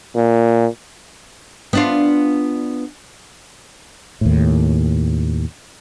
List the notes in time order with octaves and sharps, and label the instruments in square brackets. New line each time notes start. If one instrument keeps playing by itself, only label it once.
[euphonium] A#2
[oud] B3 D4 F4
[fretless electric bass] D#2 A2